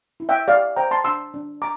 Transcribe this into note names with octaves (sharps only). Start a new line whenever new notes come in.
E4
E5 G5
G4 D5 F5
C5 G5 A#5
A5 C6
D4 C6 E6
D4
A#5 D6